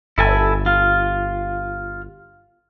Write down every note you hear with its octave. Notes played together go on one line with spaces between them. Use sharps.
G1 E4 A4 G#5
F4